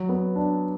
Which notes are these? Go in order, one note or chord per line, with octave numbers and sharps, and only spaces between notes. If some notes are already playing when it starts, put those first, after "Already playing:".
Already playing: F#3
B3
D4